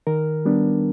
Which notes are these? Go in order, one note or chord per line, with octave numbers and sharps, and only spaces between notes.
D#3 A#4
G3 B3 D4